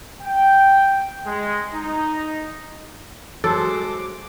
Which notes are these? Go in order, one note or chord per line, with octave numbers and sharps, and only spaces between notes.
G5
G#3
D#4
F#3 G#3 A4 C5 D6